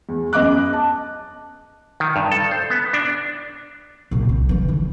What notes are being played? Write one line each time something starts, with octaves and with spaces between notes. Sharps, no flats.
E2
F#2 B3 D#5 D6 F#6
A5
D#3
G2
A4
C5
B3
D4
C2 A#2
C2
E3 D#4
D3 E4